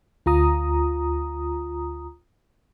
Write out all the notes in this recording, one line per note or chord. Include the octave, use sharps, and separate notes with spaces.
D2 F4 A#5 D#6